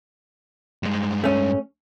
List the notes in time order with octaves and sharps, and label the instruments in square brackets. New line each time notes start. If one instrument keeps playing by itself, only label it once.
[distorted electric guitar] G2 G#3
[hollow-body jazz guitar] A3 C#4